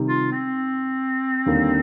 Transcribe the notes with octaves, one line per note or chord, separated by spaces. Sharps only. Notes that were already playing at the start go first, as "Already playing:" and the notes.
Already playing: C3 D#3 G3
F4
C4
D#2 D3 G3 A#3